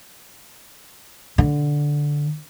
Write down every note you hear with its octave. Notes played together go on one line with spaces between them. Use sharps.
D3